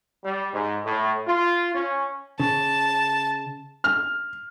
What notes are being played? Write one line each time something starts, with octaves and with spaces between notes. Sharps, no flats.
G3
G#2
A2
F4
C#4
C#3 A5
F6